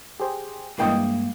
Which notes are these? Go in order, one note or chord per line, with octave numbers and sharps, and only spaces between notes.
G4 G#4 C5
G2 E3 G#3 A#3 G5 D#6